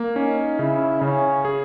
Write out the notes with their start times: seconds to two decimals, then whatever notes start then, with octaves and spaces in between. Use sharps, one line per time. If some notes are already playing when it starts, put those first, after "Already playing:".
Already playing: A#3
0.16 C#4 D#4
0.59 C#3 E4
1.01 C#3 C#4
1.45 G#4